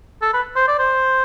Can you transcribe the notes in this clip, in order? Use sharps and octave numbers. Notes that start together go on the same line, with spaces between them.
A4
B4
C5
D5
C5